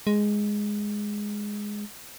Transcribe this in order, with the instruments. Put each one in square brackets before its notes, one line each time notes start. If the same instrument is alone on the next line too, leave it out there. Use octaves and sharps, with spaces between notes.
[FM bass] G#3